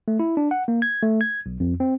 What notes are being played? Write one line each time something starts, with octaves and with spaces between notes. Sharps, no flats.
A3
E4
D4
F#5
A#3
G#6
A3
G#6
B1
F2
C4